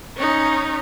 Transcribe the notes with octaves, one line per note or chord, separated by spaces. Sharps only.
C#4 D#4